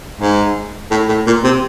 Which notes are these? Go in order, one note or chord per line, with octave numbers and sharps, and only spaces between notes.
G#2
A2
A2
A#2
C3